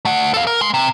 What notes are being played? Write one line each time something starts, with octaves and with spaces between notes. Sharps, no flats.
A3 F#5
A4 F5
A#4
G#3 C6
C3